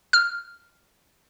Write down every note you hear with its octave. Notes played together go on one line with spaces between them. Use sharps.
F6